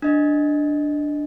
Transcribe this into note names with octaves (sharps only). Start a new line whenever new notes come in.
D4 D#5